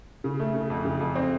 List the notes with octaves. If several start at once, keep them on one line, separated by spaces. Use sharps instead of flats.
C#3
A3
C#3
F2
C#3
F2
C4